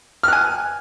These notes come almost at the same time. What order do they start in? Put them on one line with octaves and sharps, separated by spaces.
F6 F#6 G#5